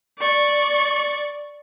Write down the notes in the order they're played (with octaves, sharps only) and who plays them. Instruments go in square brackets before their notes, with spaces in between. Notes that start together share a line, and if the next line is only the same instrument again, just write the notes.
[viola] D5 C#6